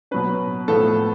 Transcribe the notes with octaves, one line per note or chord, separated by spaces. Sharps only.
B2 F#3 C#4 B4
A2 F3 B3 A4